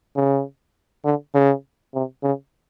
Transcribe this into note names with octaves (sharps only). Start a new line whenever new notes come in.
C#3
D3
C#3
C3
C#3